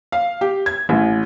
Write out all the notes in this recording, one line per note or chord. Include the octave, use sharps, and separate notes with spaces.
F5
G4
G#6
A1